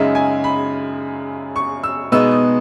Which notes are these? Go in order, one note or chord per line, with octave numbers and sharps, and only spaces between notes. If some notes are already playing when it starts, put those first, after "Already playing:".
Already playing: F#2 C#3 G#3 D#4 E5
G#5
B5
C#6
E6
B2 G#3 B3 D#4 E6
D#6